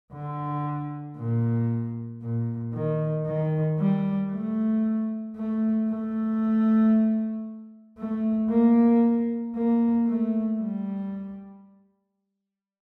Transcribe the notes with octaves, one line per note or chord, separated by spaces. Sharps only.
D3
A#2
A#2
D#3
D#3
G3
A3
A3
A3
A3
A#3
A#3
A3
G3